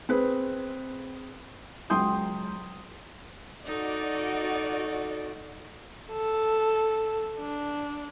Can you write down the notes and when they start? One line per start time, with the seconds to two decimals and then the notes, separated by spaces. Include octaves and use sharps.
0.09 C4 G#4 B4
1.90 C#2 F#3 G5 C6 D#6 G6
3.64 D#4 F#4 A4 D5 D#5
6.12 A4
7.38 D4